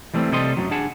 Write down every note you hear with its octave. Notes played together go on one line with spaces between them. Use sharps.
E3 G3 A3 A#3 C4
C3 G3 A4 D#5 C6
F#2 D#3 F#3
D4 G#4 F#5 A5